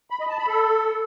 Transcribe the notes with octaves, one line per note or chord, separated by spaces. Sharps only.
B5
D#5
A5
B5
A4